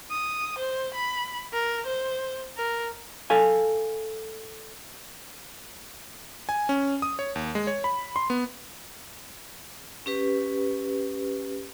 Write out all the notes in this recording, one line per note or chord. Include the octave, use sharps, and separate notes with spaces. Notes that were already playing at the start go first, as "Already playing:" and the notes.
D#6
C5
B5
A#4
C5
A#4
A4 F5 G#5
G#5
C#4
D#6
C#5
D#2
G#3
C#5
B5
C6
B3
C#4 G4 B4